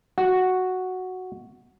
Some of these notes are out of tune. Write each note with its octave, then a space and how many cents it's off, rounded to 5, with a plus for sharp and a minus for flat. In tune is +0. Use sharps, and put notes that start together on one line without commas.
F#4 +0 F#5 +0